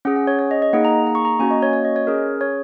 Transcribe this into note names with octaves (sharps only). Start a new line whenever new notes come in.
C#4 G#4 F#5
F#5
C#5
C#5
D#5
D#5
A#3 D#4 G#4 F#5
A#5
A#5
C#6
A#5
A#3 C#4 F#4 G#5
D#5
C#5
C#5
D#5
C#5
C#4 G#4 A#4
C#5